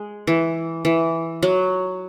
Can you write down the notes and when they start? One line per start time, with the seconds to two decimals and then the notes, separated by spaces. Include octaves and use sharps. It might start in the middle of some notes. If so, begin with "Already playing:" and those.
Already playing: G#3
0.27 E3
0.85 E3
1.43 F#3